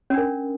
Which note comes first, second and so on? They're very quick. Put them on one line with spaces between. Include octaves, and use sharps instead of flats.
C#4 D4 A#4